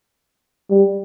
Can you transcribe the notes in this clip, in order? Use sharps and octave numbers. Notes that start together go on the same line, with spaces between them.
G3